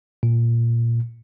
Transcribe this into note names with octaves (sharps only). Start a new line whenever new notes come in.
A#2